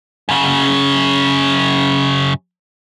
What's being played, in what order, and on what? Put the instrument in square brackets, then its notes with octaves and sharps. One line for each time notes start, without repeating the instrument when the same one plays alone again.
[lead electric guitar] F#2 C#3